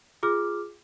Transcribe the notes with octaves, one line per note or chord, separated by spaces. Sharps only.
F4 G#4 D6 F6